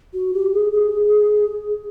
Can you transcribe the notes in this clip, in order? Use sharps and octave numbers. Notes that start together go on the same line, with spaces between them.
F#4
G4
G#4
G#4